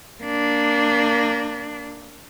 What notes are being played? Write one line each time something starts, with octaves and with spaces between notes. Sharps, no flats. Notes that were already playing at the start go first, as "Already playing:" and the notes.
A#3 D4